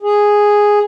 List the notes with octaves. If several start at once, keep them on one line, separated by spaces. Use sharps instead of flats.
G#4